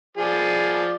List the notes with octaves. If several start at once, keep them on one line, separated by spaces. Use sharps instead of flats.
F3 G#4 D5